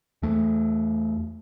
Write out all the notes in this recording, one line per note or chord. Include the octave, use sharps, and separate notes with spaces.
E2 A3